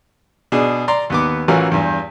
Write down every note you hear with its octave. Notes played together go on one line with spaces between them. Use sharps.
B2 D4 G#4
D5 A#5 C6
D#2 B3 D6
A1 E3 C#4 F4 F#4 A#4
E2 G2